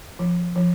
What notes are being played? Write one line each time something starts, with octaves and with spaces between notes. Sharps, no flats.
F3
F3